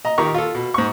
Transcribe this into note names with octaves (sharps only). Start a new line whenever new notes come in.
D#5 A#5
A#2 D#3 G4 A#4 A#5 C#6
F4 A4
B2
G#2 C#6